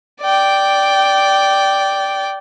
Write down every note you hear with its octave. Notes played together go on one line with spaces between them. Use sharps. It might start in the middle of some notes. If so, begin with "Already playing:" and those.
D5 G5